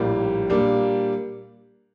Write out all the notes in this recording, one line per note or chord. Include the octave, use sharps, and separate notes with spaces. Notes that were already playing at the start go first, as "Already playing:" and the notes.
Already playing: A#1 A2 G3 A#3
A#2 G3 A#3 D4